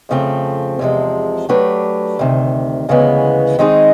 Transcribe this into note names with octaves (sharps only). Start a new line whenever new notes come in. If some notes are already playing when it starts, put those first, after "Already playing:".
F2 C#3 F3 A3 C4
E2 C3 F3 G#3
F#3 A3 D4 G4 B4
D2 C3 D#3
D2 C#3 E3 G#3 B3
D#3 G#3 C4 D#4 G#4